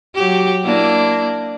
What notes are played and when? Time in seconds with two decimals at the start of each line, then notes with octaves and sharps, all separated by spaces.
0.15 F#3 G4
0.65 A#3 D4 E4